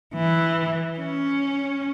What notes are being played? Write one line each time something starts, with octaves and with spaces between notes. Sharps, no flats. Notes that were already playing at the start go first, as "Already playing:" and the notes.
E3
C#4